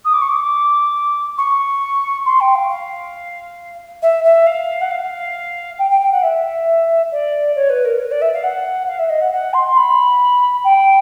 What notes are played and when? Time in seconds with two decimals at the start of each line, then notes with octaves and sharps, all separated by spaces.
0.05 D#6
0.13 D6
0.21 C#6
0.29 D6
1.38 C#6
2.25 C6
2.40 G5
2.55 F5
2.69 F5
4.02 E5
4.24 E5
4.46 F5
4.81 F#5
4.91 F5
5.79 G5
5.90 G5
6.01 G5
6.11 F#5
6.22 E5
7.12 D5
7.55 C#5
7.70 B4
7.85 A#4
8.00 B4
8.11 D5
8.21 E5
8.33 F5
8.43 F#5
8.87 F5
8.99 E5
9.09 D#5
9.21 F#5
9.31 F#5
9.53 C6
9.77 B5
10.64 G5